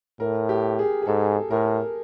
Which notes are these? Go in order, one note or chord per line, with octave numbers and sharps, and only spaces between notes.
A2 A#4
G4
G#4
G#4
G#2 A4
A2 A#4